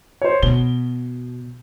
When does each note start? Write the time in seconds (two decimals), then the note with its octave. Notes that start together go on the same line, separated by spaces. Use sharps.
0.22 C5 C#5
0.43 B2 G7